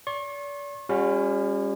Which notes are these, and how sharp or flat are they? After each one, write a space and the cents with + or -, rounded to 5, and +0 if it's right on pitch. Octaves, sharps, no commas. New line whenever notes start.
D5 -40 C#6 -45
G3 +45 C#4 +0 F#4 -30